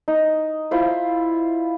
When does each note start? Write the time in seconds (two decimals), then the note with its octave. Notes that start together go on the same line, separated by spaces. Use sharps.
0.08 D#4
0.71 E4 F4 C5